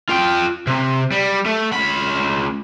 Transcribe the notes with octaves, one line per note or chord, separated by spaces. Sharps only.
F4 G5
C3
G3
A3
C#2 B5